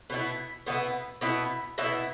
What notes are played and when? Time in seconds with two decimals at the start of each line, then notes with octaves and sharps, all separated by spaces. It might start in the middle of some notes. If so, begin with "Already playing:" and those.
0.10 B2 B3 E4
0.66 B2 B3 E4
1.21 B2 B3 E4
1.78 B2 B3 E4